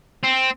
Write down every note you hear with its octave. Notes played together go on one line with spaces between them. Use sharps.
C4